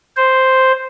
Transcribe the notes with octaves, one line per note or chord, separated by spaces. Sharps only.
C5